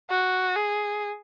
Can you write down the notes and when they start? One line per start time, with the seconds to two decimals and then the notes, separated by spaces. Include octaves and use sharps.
0.10 F#4
0.56 G#4